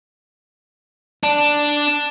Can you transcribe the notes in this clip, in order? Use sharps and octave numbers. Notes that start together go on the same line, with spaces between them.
D4